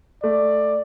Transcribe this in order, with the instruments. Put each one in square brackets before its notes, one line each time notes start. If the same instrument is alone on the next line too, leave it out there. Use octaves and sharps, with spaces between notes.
[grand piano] A3 [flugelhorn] D5